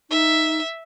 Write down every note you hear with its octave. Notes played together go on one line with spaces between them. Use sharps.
D#4 E5